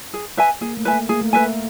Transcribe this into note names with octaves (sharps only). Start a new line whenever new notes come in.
G#4
B4 E5 G#5
A#3 G#4
A3
B4 E5 G#5
A#3
A#3 G#4
A3
A#3 B4 E5 G#5